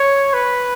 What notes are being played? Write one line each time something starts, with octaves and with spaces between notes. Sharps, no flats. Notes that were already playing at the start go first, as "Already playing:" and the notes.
Already playing: C#5
B4